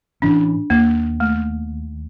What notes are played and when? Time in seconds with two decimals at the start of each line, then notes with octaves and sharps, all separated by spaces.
0.22 A2 E3 C#4 D4
0.70 D#2 A#3
1.20 A3